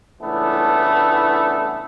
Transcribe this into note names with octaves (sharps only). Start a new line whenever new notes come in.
C#2 A2 E3 A3 B3 D4